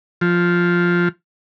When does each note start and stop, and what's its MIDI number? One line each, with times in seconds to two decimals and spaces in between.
0.21 1.08 53